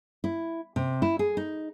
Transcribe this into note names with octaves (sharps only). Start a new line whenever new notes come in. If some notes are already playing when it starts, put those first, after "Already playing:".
E4
C3
E4
G#4
D#4